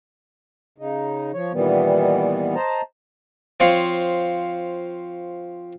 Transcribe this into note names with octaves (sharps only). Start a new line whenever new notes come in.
C#3 D#4
F3 C#5
A#2 D#3 E3 G3 B3
C5 D#5 A5 A#5
F3 C4 C#5 F5